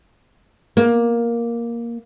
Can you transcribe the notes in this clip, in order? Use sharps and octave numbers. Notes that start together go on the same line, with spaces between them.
A#3